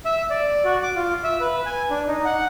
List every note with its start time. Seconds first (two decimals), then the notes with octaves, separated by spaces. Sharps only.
0.05 E5
0.30 D5
0.65 F#4
0.83 D6
0.96 F4
1.24 E5
1.41 B4
1.66 G#5
1.90 D4
2.07 D#4
2.25 F#5